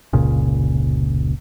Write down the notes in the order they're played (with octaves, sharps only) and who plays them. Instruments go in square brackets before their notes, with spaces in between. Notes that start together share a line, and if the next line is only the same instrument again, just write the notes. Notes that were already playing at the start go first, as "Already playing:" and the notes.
[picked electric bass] F1 C#2 A#2 C#3